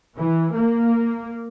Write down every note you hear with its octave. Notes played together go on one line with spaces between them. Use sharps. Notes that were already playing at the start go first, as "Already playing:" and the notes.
E3
A#3